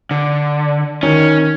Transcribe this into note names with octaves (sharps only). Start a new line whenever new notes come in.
D3
D#3 C#4